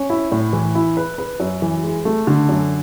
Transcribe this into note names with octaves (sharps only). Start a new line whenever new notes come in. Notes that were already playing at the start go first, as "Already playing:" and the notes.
Already playing: C#4
E4
A2
E3
E4
B4
B4
F#2
E3
G#3
A3
D3
F#2